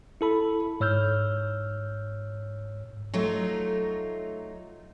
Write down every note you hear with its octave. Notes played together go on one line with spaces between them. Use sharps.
E4 A4 B5
G#2 C#5 E6 F6 G6
F#3 A3 D#4 F4